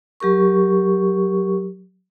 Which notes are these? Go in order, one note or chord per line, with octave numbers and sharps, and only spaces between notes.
F#3 G4 A#4 C#6